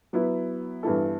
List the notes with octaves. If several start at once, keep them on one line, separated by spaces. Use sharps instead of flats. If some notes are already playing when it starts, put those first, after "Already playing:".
F#3 B3 E4
G2 E3 B3 E4 A4